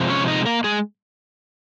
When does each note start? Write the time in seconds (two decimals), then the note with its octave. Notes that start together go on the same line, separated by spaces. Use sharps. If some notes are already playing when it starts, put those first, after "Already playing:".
Already playing: C3 F3 G#3
0.10 C#4 C#5
0.28 D#4 D#5
0.46 A#3 A#4
0.64 G#3 G#4